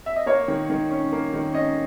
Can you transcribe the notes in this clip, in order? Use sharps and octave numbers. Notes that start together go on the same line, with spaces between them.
E5
D#5
A#3 C#5
D#3
D#3
C#4
A#3
D#3
C#4 D#5